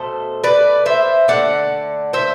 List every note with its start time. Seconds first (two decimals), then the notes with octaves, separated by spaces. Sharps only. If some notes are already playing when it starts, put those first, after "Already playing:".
Already playing: B2 A3 A4 C5
0.44 B4 D5
0.86 C5 E5
1.28 D3 A3 D5 F#5
2.13 C5 E5